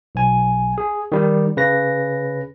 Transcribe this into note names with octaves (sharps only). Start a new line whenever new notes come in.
B1 G#5
G#4
D#3 G3
C#3 B4 A#6